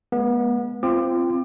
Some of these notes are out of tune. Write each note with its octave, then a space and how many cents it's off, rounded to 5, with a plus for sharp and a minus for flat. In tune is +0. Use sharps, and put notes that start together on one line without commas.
G#3 +30 B3 -35
C4 +0 F4 -25 D6 +30